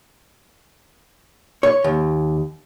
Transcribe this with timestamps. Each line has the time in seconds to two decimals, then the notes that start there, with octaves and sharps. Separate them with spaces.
1.63 C#5
1.84 D#2